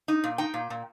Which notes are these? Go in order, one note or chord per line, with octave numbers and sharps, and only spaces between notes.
D#4
A#2
D#4 G5
A#2
A#2